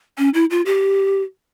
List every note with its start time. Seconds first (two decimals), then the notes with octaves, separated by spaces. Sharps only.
0.18 C#4
0.34 E4
0.51 F4
0.66 G4